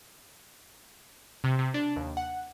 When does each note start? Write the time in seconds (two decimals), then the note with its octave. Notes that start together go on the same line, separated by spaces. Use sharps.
1.44 C3
1.59 C3
1.74 D4
1.96 D#2
2.17 F#5